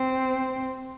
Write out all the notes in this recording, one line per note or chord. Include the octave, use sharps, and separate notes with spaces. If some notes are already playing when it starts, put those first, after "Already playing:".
Already playing: C4